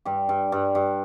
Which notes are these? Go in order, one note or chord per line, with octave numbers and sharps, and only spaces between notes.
G2 G4
G2
G2
G2